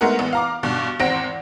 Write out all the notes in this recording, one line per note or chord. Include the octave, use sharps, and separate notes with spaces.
G#3 A3 B3 A#4 F#5
A1 B3
F5 A#5 D6
G2 B2 D3
G#1 E2 C4 F#5 A#6 D7